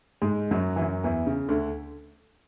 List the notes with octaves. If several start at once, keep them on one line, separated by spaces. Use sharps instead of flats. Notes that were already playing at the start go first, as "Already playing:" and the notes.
G#2 G#3
F#2 F#3
E3
F#2 F#3
E2 E3
C#3
D2 D3